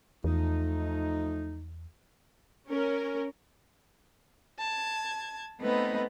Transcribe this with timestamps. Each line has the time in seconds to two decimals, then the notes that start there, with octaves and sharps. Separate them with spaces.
0.24 E2 F3 A3 D#4
2.68 C#4 A#4
4.61 A5 G#6
5.60 A3 B3 C4 D#4 B4